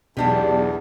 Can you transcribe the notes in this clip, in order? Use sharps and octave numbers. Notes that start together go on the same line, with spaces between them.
B1 E2 G#3 D4 G4